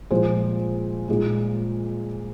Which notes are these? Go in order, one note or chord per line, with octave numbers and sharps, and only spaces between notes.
A#2 F3 G#3 G#4 C5
A#2 G#3